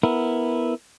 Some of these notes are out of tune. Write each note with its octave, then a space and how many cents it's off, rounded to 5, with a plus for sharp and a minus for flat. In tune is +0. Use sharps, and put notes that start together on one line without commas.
B3 +0 E4 -5 A#4 -10